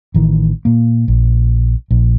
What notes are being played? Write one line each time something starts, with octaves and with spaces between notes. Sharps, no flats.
A1 D#3 E3
A#2 A#3
A#1
A#1